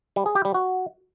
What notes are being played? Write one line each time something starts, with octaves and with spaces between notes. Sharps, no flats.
G3
G#4
G4
G3
F#4